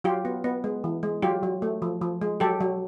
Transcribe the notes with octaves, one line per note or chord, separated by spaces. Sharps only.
F#3 F4 G4
B3
B3
G#3
E3
G#3
F#3 F4 G4
F#3
A3
F3
F3
G#3
F#3 G4 A4
F#3